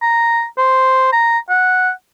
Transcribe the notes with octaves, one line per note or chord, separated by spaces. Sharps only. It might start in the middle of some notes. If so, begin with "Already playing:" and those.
A#5
C5
A#5
F#5